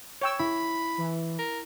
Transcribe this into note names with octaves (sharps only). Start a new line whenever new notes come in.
C#5 G5 E6
E4 B5
E3
A#4